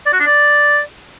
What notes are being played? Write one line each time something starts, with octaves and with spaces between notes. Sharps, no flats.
D5
F#4
D4
D5